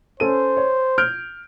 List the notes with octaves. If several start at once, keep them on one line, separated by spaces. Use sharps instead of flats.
C#4 A4 C5 D#7
C#5
F6 G6 D7